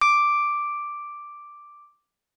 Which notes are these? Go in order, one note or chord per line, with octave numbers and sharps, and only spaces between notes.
D6 D7